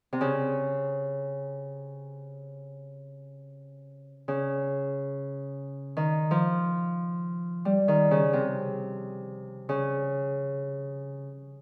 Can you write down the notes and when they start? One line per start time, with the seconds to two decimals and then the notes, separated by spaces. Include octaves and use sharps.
0.13 C3
0.21 C#3
4.28 C#3
5.97 D#3
6.31 F3
7.65 G3
7.88 D#3
8.11 C#3
8.33 C3
9.69 C#3